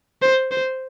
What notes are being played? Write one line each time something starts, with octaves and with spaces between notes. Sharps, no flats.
C5
C5